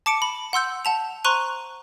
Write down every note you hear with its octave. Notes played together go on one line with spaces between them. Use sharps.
A5 D6 C#7 D7
B5
F#5 C6 E6 G6
F#5 A5 F7
C5 A#5 C6 C#6 F#6 D#7